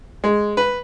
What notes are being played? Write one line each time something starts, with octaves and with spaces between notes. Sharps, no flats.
G#3
B4